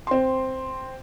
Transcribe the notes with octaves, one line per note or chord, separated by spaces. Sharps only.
C4 C6